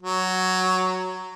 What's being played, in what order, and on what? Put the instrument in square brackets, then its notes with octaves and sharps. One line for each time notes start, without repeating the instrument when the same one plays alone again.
[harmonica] F#3